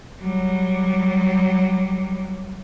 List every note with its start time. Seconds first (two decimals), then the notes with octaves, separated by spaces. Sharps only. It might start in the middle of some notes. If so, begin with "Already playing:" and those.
0.22 F#3 G3